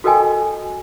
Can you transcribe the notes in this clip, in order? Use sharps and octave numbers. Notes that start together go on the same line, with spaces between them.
F#4 A4 A#4 D#5 G5 G#5